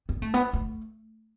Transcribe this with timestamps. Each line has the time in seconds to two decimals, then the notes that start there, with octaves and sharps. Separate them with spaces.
0.09 B3
0.22 A3
0.34 B3
0.53 A3